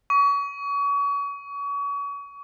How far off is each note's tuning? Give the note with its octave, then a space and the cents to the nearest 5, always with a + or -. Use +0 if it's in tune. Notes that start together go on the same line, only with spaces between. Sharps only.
C#6 +35